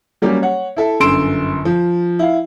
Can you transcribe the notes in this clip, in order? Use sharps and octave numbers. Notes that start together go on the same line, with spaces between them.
F#3 G3 A#3 C#4 G4
C#5 F#5
E4 A4 E5
G1 F#2 C6 E6 D7 E7
F3
E4 F5